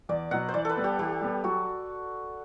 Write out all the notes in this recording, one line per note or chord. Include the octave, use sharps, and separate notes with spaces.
E2 D5
B2 F#3 F#5
C5
E3 D5
A4 B4
G3 B3
G4
E3 G4
G3 B3
F#3 F#4